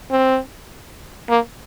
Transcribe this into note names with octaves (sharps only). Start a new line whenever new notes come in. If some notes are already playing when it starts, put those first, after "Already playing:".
C4
A#3